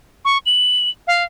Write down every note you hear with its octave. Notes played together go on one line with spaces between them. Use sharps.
C#6
F#7
F5